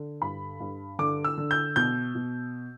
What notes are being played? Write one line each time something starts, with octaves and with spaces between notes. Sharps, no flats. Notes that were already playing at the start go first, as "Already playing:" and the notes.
Already playing: D3
G2 B5
G2
D3 D6
E6
D3
G6
B2 G6
B2